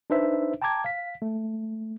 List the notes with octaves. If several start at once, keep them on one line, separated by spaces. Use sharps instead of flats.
D4 D#4 B4 C5 E5
G5 A5 A#5 D6 G#6
F5 B6
A3